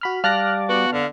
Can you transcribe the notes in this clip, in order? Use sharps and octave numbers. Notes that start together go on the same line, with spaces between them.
F#4 B5 F6
G3 D5 F5 A5 F6 F#6 A6 A#6
B3 F#4
D3 F5